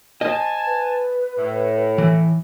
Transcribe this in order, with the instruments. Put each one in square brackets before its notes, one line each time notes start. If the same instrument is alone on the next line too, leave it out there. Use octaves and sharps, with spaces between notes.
[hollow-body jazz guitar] C5 D#5 [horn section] G#5 A5
[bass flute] B4
[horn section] A2
[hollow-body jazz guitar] E3